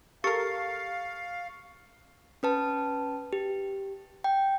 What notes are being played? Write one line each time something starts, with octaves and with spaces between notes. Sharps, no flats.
G4 A4 A#4 F5 C#6 A6 C#7
C#4 B4 A5
G4
G5